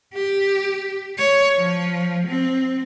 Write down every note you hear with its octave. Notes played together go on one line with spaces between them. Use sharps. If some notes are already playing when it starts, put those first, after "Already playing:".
G4
C#5
F3
C4